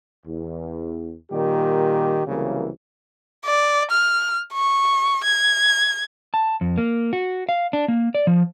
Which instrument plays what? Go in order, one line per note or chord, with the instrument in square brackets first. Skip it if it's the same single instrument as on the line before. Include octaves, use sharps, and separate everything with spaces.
[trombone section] E2
A#2 D#3 G3 G4
C2 C#3 E3 F#3 A#3
[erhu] D5
F6
C#6
G#6
[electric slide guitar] A5
F2
A#3
F#4
F5
D4
A#3
D5
F3